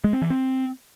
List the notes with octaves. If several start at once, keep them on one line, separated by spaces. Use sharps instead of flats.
G#3
C4
E3
C4